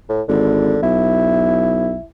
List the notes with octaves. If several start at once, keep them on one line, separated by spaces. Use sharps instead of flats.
A2
G#1 D3
B1 E4